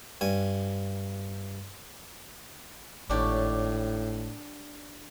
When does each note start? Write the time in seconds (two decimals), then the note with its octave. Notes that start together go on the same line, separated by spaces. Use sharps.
0.21 G2 G#5
3.10 G#1 A2 D4 G4 C#5